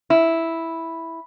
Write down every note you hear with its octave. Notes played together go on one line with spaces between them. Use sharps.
E4